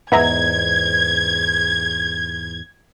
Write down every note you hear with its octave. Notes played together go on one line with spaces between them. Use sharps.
E2 G#2 B3 E5 A#5 G#6